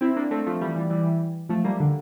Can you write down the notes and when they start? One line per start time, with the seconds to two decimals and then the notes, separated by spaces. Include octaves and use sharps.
0.01 C4 E4
0.16 A#3 D4
0.31 A3 C4
0.47 F3 A3
0.61 E3 G3
0.76 E3 G3
0.90 E3 G3
1.49 F3 A3
1.64 G3 A#3
1.80 D3